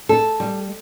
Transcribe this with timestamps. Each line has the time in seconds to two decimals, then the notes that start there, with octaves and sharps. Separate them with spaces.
0.09 A4
0.40 G3